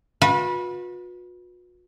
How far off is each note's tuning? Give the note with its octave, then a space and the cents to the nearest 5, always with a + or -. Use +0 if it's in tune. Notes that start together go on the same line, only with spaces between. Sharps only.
F#4 -45 B4 -20